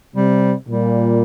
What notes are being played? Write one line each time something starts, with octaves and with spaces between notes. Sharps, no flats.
C3 G3
A#2 G3